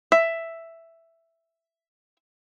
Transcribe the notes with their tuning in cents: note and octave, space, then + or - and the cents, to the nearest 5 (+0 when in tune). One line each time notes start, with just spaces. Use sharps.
E5 +5